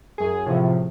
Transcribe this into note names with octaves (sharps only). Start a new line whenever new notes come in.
F#2 G#4
A2 C3 F3